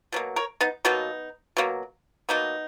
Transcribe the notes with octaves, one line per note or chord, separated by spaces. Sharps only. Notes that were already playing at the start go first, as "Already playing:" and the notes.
B2 F#3 A#3
A#4 C#5
B3 D#4
B2 F#3 A#3 B3 D#4
B2 F#3 A#3
B2 F#3 A#3 B3 D#4